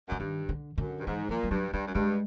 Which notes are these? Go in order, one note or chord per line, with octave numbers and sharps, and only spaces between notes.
F#2 D3
G2 D#3
D3
F#2 D3
G2
G#2 E3
A#2 F3
G3
G2 F#3
G2 G3
F#2
G2 G#3